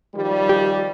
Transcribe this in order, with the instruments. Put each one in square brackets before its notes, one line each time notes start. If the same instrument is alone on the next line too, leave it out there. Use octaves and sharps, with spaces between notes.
[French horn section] D#3 F3 G3
[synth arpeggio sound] G4